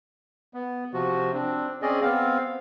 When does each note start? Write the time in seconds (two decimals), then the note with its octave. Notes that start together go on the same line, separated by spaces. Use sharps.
0.54 B3
0.93 C3 F3 F#4
1.33 C4 D4
1.82 C4 C#4 G#4 D5 D#5
2.02 B3 C4 F5